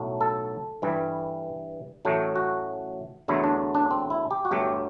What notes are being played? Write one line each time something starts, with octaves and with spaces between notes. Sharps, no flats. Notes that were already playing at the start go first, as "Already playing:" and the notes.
Already playing: B1 A2 F#3 A3
A4
G2 E3 G3
A1 A2 F#3 A3
F#4
E2 D3 F#3 A3 E4
D4
D4
C4
E4
G4
F#4
G1 G2 F#3 A3 G4